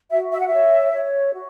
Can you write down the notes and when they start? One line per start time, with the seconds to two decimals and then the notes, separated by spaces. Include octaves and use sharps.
0.11 F#4 E5
0.32 E5
0.40 F#5
0.47 E5
0.53 C#5
0.93 C#5
1.33 F#4